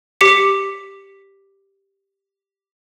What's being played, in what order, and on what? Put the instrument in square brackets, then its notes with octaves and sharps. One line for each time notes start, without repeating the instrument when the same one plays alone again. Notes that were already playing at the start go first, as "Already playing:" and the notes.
[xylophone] G4 D6 B6 C#7